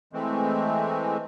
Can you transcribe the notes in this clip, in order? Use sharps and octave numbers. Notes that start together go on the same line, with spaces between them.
E3 G#3 A3 C4